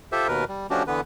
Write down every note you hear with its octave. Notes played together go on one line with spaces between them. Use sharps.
F4 G4 A4 C5 E5
D#2 B2 A#4 B4
G3
F3 A3 C#4 D4 F#4 G4
D3 E3 B3 B4